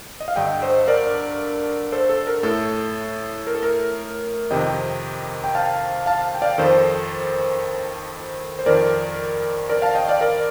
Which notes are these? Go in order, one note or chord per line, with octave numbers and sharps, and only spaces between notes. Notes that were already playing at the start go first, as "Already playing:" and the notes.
D#5
F5
G2 D3 D#5 G5
C5 D#5
A#4 D5
A4 C5
A4
A#4
A2 A4
A#4
A4
A#4
F2 C3 D#3 D#5 G5
G5
F5 A5
F5 A5
G5
D5 F5
F2 D#3 A4 C5
C5
F2 D#3 A#4 D5
A#4 D5
F5 A5
D#5 G5
D5 F5
A#4 D5